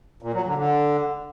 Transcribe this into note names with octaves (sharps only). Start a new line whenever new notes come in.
A#2
F#3
D3
D3